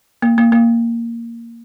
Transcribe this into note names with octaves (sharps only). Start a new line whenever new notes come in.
A#3
A#3
A#3